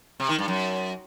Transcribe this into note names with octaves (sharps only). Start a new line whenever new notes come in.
C3
D#3
G2
F#2